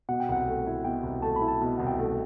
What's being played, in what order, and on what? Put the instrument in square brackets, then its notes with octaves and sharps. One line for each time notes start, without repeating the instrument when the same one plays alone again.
[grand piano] B2 [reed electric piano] F#5
[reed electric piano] G5
[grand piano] C2 [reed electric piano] F#5
[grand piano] A3
E4
[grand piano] B2 [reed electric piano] G5
[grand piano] C2
[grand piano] A3 [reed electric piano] A5
[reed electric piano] B5
[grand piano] E4
[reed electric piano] A5
[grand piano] B2
[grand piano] C2 [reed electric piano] F#5
[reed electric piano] G5
[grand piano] A3